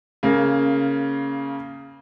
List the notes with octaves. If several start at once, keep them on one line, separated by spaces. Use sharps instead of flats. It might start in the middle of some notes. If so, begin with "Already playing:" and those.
C#3 A#3